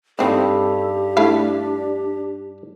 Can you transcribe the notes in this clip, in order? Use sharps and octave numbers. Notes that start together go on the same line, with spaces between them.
G2 C4 D#4 E4 G4 A4
A3 D4 E4 F5